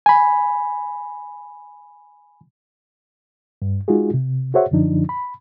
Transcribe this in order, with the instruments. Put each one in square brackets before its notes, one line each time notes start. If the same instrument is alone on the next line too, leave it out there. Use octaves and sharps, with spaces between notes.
[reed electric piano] G#5 B5
G2
G#3 D#4 F4 F#4 G#4
C3
F#4 G#4 C5 C#5 E5 F#5
F#2 D3 F3 D4 D#4
B5